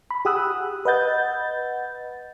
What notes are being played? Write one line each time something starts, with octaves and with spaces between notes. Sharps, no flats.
B5
G4 G#4 F#5 D#6 E6 F#6
B4 D#5 F#5 G6 A6